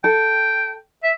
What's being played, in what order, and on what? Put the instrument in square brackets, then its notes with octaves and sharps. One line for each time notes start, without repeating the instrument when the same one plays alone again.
[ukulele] A4 [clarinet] G5
[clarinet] E5